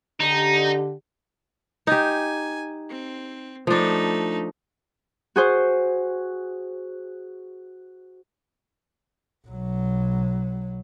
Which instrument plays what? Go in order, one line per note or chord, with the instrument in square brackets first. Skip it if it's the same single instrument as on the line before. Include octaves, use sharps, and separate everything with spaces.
[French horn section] D3 G4 [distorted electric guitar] D#4
[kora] D#4 G4 [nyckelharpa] G#5
[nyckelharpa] C4
[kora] F3 D4 [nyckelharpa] A3 D#4
[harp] F#4 G#4 C5
[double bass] B1 F#3